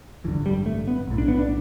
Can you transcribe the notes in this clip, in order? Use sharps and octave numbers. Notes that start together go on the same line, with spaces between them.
A1 G2 D3 E3
G3
A3
B3
B1 A2
D4
B3
D4